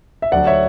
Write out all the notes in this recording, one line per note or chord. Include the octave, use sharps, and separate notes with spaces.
E5
D2 D3 F#3 D5 F#5
C#5 E5